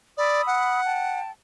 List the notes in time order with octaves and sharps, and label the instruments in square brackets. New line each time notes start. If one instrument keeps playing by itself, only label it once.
[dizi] D5 [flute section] B5 D#6 E6
[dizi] F#5
[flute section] G5 A5